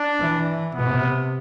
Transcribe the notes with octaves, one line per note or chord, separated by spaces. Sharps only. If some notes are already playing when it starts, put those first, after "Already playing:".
Already playing: D4
E3
C3 B3